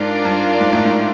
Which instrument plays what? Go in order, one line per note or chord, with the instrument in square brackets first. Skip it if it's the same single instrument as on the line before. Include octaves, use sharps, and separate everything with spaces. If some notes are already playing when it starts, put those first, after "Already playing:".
Already playing: [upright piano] G#2 [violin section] D4 F4 A#4 D5
[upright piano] G2
G#2
A2
G#2